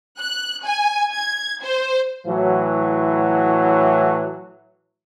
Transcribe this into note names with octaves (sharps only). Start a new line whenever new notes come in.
F#6
G#5
G#6
C5
A2 E3 F#3